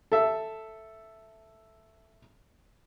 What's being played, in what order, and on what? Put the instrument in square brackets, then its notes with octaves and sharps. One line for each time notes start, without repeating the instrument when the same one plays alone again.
[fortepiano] A4 E5